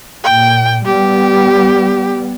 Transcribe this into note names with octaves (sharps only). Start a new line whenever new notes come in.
A#2 G5
G3 B3 G4